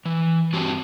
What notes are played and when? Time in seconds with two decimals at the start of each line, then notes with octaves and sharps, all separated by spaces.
0.05 E3
0.53 G2 F#3 C4 F#4 G4 A5